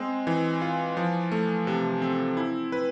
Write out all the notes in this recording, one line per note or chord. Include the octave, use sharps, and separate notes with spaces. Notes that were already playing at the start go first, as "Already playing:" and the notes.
Already playing: G#3 C4
E3
F4
F3
A3
C3
C4
E4
B4